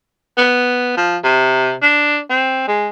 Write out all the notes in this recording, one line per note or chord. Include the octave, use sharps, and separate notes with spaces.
B3
F3
C3
D4
C4
G#3